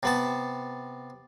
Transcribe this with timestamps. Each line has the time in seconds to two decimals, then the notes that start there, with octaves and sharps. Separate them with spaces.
0.03 C3 B3 A5